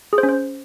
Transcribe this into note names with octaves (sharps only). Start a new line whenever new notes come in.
G#4
C5
C#4
C5